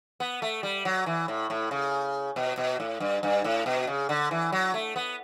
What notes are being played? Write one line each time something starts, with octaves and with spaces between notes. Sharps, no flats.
B3
A3
G3
F#3
E3
A2
A2
C#3
B2
B2
A2
G2
G2
A2
B2
C#3
D3
E3
F#3
A3
B3